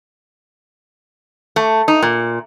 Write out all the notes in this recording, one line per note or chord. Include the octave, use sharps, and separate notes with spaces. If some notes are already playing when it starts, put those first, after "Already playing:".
A3
D#4
A#2